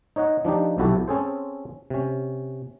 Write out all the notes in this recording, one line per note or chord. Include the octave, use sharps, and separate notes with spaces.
D#4 C#5 D#5 F#5
F3 D4 D#4 G4
B1 C3 E4 F#4 G4 A4
C4 C#4 G#4 A4 C5
C3 C#4